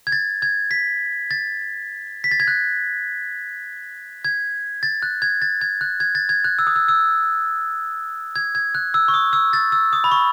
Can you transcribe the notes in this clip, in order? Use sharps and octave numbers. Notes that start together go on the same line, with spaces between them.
G#6
A6
G#6
B6
A6
B6
A6
G#6
F#6
G#6
A6
F#6
G#6
A6
G#6
F#6
G#6
A6
G#6
F#6
E6
D#6
E6
E6
G#6
G#6
F#6
E6
C#6
D#6
E6
A6
E6
D#6
B5
C#6